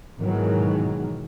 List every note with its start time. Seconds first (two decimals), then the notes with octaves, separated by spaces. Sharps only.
0.17 G#2 B2 D#3 E3 F#3 G#3